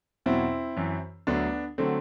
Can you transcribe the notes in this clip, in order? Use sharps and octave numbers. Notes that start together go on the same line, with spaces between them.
E2 B2 F#3 C4 E4
F#2 E3
D2 D3 F#3 B3 D4
D3 F#3 A3 C4